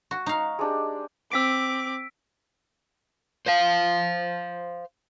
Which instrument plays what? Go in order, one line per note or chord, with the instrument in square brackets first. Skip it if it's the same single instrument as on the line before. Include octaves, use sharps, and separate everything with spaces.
[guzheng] F#4 [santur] C#6
[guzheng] D#4 F5
[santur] G#3 D4 G4
[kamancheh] C4 D6 [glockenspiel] E6 B6 D7
[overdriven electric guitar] C5 F5